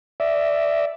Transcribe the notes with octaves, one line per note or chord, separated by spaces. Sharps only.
D5 E5